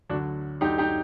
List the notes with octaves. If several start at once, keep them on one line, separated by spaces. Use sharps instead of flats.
D2 D3 F#3 D4 F#4
D2 D3 F#3 D#4 G4
D#4 G4